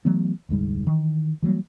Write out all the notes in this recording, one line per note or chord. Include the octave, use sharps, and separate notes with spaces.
E3 F#3 A3 B3
F1 D2 G#2 G3
D#3 E3
E3 F#3 G3 A#3